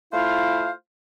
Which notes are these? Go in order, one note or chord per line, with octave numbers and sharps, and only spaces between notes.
A3 E4 F4 C5 F5